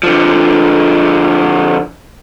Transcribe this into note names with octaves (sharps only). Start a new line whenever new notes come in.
D3 F3